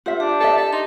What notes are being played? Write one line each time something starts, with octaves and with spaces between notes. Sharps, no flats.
F4 G4 C5 E5
D4 G4
A4 C5 D#5 E5
A4 E5
D#4 C6